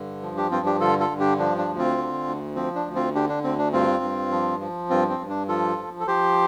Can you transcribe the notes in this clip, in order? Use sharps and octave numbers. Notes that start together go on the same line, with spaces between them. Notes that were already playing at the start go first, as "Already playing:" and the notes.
Already playing: G2 D3
F3
D4 G4
G2 C4 F4
D4 G4
D3 F4 A4
F4 A4
G2
D4 G4
F3 D4
D4
D2
C4 F4
D3
D2
F3 C4
D4
D2
C4 F4
D3 D4 G4
D4
D2 C4
D4
G2 C4 F4
G2
F3
F3
G2 C4 F4
C4
G2
D4
F3 F4 A4
F3
A4
F3 G4 C5